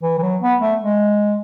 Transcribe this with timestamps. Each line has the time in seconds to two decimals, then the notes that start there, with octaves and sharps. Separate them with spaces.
0.03 E3
0.18 E3
0.22 F#3
0.41 B3
0.61 A3
0.80 G#3